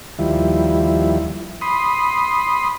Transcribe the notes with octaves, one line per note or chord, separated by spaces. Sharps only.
D#2 F3 G3 E4
B5 C6 D#6